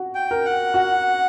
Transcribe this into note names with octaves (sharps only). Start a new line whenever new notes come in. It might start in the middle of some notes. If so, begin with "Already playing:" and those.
Already playing: F#4
G5
A#4
F#5
F#4